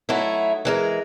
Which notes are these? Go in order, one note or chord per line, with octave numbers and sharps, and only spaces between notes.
F#3 A3 D#4 E4
E3 G#3 A#4